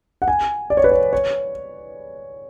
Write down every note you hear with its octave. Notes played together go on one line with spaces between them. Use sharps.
F#5
G#5
D5
C#5
B4
C#5
C#5